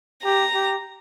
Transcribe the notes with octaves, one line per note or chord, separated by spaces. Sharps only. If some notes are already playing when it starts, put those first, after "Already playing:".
G4 A#5
G4